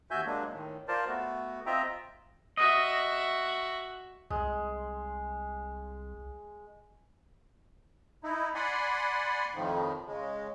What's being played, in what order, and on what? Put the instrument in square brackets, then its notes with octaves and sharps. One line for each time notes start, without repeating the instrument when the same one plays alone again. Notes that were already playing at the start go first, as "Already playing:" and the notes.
[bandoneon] D#2 F#4 E5 G#5 G6
F#3 G#3 A#3 D4
A2 D#3
F4 A#4 C5 D5 A5
A3 B3 F#4
C4 F4 D#5 E5 G5 A#5
[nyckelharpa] F#4 E5 [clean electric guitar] D#5
[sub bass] C2 [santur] G#3
[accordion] D#4 E4
D5 F#5 G#5 B5 C6
F2 A2 D#3 F3
C#3 G#3